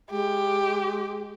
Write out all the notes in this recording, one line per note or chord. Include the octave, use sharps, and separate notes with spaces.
G#3 G4